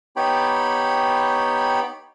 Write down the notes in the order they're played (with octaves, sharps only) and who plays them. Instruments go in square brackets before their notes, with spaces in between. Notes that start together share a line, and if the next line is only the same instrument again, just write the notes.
[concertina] B3 D#4 G4 C#5 G5 B5